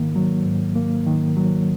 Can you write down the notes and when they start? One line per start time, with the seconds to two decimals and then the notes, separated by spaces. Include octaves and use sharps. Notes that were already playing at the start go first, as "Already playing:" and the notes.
Already playing: G#2 D#3 A#3
0.16 F#3
0.45 G#2
0.75 A#3
1.07 D#3
1.36 F#3